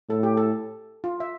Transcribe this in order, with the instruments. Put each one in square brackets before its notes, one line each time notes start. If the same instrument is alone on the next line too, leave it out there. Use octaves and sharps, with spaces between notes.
[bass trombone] A2 [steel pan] A4
[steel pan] G4
A4
F4
E5